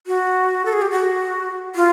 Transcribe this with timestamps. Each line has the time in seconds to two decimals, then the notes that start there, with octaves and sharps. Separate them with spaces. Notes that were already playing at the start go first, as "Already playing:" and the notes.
0.07 F#4
0.65 A4
0.73 G#4
0.82 G4
0.91 F#4
1.75 F4